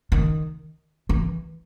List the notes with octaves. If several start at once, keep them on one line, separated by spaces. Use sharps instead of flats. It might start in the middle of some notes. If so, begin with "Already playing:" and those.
D#3
E3